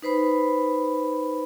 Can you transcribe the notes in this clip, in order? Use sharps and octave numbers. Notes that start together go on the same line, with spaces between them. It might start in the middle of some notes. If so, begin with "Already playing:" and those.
D#4 B4 C5 B5